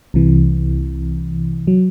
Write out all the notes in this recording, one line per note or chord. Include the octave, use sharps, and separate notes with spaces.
C2 C3 E3
F#3